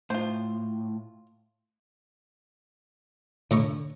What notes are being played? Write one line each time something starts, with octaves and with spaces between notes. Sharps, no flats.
A2 F4 C5
A2 D3 A#5 C#6